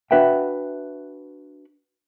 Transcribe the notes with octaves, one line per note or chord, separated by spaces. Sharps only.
D4 F#4 B4 E5 F#5 G5